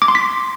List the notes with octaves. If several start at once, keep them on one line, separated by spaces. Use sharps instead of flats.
D6
C6
B6